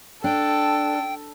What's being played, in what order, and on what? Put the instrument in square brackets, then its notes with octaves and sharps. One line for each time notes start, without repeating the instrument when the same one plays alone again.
[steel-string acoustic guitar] D4 [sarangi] A4 [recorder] G5